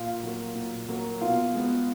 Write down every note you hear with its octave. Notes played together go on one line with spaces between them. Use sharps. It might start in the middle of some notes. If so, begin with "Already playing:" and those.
Already playing: A#2 F4 F5
F#3 A#3
A#2
F#3 A#3
B2 F4 F5
G#3 B3